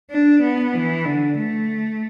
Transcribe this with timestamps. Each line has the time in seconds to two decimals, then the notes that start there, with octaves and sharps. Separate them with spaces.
0.11 D4
0.42 B3
0.74 E3
1.05 D3
1.37 A3